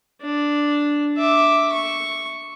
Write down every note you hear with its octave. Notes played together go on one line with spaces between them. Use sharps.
D4
E5 D6
C#6